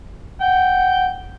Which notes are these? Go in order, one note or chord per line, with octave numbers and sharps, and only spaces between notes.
F#5 G5